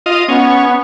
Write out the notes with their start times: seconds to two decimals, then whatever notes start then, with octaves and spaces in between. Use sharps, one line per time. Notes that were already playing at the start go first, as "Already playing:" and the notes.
0.06 F4 D#5
0.28 B3 C#4